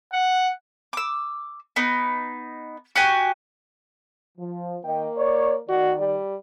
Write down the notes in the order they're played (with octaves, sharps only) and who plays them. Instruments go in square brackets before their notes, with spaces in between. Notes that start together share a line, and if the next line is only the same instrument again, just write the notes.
[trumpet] F#5
[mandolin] D6 E6
B3 D#4
F#4 G4 G#5
[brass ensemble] F3
[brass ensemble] D#3 D#5 G5 [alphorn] A#3
[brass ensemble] C#5 D5
[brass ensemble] D#3 D5 [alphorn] F#4
[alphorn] G3